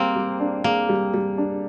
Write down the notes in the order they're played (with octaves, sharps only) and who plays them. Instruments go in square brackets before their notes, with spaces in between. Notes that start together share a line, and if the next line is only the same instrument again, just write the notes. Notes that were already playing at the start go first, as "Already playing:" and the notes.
Already playing: [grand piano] G3 G#4 [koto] A#3 C4
[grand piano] G3
D4
[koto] A#3 [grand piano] G#4
[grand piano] G3
G3
D4